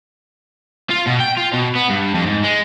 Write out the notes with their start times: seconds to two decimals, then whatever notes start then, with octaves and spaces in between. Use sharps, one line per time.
0.90 F4
1.06 B2
1.20 G5
1.37 F4
1.53 B2
1.75 B3
1.90 G2
2.14 F2
2.26 G#2
2.43 G#3